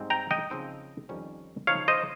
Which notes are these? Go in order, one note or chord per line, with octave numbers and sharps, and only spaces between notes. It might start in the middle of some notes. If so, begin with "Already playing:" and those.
Already playing: G#2 G3 C4 D#4
G5 A#5
D#5 G5
C#3 F3 C4 D#4
F2 D#3 G3 C#4
C#3 F3 A#3 D#4 C#5 F5
C5 D#5